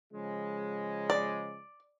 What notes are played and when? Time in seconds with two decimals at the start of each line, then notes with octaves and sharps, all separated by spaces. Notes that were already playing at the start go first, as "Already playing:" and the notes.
0.13 C#3 F3 G#3
1.10 D5